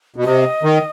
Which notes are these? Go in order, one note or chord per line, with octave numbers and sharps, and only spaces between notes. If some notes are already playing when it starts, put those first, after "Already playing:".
B2
C3 D#5
D#3